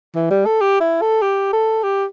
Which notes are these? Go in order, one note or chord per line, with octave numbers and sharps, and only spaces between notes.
E3
G3
A4
G4
E4
A4
G4
A4
G4